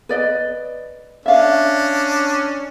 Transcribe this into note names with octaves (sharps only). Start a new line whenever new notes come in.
B4 D5 D#5
C#4 D4 E5 F5